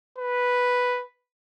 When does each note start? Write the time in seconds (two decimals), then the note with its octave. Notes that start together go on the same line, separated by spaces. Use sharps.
0.18 B4